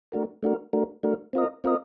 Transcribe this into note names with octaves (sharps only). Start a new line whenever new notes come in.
A3 D4 F#4 A#4
A3 D4 F#4 A#4
A3 D4 F#4 A#4
A3 D4 F#4 A#4
C4 F4 A#4 D#5
C4 F4 A#4 D#5